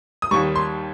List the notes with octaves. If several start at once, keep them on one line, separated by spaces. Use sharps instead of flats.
D#6
D#2 D#3 G3 C#6
C6